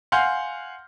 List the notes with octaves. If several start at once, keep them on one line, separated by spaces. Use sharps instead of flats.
F5 F#5 G#5 C6 F6 G6